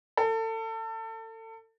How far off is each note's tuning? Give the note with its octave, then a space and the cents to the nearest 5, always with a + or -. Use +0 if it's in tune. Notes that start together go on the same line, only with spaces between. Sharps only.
A4 +30